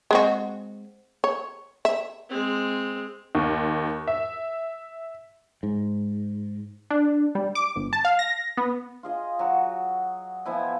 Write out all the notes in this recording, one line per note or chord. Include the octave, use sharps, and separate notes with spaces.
G#3 C4 F#4
C#5
E5
G#3 C4
D#2
E5
G#2
D4
G3
D6
G1
A5
F5
A#6
B3
F4 G#4 D#5
F#3 F#4
B2 F3 E4 G#5